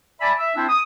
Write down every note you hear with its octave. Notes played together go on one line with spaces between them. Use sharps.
D5 E5 G#5 A5 B5
E5
C4 D4 E4 C5 E5 A5
D#6